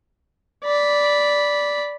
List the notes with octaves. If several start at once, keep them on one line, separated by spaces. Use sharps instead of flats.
D5 B5